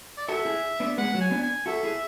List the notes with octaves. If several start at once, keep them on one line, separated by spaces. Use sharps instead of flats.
D5
F#4 A4 E5
A4
E4 G#4
B3 D4
G#3 B3 F#5
F#3
G#5
B3 D4
G#5
F#4 A4 E5
E4 G#4